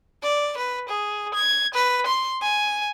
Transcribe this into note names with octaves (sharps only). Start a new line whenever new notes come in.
D5
B4
G#4
G#6
B4
C6
G#5